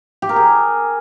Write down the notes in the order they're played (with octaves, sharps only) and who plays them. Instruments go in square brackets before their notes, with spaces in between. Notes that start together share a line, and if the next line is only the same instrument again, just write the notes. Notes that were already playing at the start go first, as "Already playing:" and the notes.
[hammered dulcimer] G4
A#4
G#4